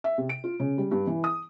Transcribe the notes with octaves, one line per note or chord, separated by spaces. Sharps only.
E5
C3
D7
F4
C#3
G3
G2
E3
D#6